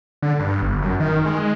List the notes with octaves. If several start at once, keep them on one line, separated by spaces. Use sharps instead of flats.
D3
G2
G1
F#2
D#3
G#3